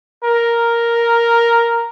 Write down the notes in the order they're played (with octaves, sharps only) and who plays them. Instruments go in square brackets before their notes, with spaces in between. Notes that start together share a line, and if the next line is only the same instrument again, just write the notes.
[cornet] A#4